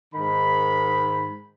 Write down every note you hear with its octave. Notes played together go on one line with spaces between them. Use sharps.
G#2 D#3 B5